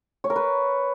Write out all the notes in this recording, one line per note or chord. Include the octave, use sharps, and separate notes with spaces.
C#5
A#4
B4